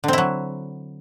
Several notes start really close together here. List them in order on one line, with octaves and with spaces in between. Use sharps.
D3 C4 E4 F#3